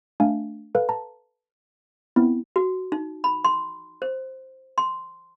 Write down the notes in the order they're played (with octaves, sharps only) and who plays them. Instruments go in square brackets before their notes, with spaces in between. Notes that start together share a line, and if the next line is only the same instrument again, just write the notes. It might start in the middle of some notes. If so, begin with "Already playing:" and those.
[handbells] A3 D4 F5 G#5
A4 B4 F5
A5 A#5
B3 C4 E4
[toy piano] F#4
D#4
B5
C6
C5
C6